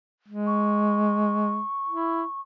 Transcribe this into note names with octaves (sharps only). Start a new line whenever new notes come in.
G#3
C#6
E4